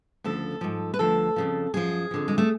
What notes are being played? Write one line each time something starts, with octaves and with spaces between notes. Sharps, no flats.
D2 C#3 F3 A4
G#2 F3
B4
D2 D3 F3 A4
F2 C#3 F3
F#2 F3 G#4
F2 D3 F3
G#3
A3